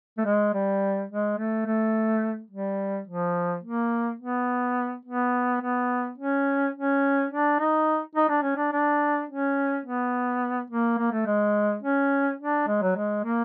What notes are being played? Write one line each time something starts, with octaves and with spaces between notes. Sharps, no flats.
A3
G#3
G3
G#3
A3
A3
G3
F3
A#3
B3
B3
B3
C#4
C#4
D4
D#4
D#4
D4
C#4
D4
D4
C#4
B3
A#3
A#3
A3
G#3
C#4
D4
G#3
F#3
G#3
A#3